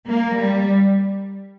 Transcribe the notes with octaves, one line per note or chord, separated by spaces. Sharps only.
A#3
G3